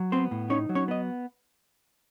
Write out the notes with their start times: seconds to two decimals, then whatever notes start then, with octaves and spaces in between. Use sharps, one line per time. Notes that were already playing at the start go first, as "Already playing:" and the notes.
Already playing: F#3
0.12 B3 C4 C5
0.31 A2
0.50 C#4 D#4 C#5
0.69 F#3
0.75 C#4 C#5
0.88 B3 D#5